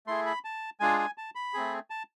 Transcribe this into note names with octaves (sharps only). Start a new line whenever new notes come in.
A3 E4 G#4 C6
B5
A5
G#3 D4 F4 G#4 G#5
G#5
A5
B5
A3 C4 G#4
A5